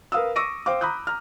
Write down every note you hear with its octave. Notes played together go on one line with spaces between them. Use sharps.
A#4 B4 F5 D#6 E6
C#6 D6 E6 A#6 D7 D#7
C5 F5 G5 D6
A#5 B5 D6 D#6 F#6 G6
A#5 F6